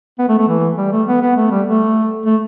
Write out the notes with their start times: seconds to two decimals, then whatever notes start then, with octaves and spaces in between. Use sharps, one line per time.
0.19 B3
0.29 A3
0.39 A3
0.48 E3
0.78 G3
0.92 A3
1.08 B3
1.22 B3
1.37 A3
1.51 G3
1.67 A3
2.26 A3